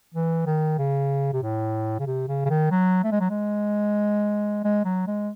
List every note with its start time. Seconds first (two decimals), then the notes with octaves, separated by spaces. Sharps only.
0.14 E3
0.46 D#3
0.78 C#3
1.33 C3
1.43 A2
1.99 C#3
2.07 C3
2.28 C#3
2.45 C#3
2.50 D#3
2.71 F#3
3.04 A3
3.12 G#3
3.20 F#3
3.30 G#3
4.64 G#3
4.85 F#3
5.07 G#3